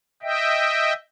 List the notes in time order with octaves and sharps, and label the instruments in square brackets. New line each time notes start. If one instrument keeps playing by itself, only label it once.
[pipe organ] D#5 E5 G5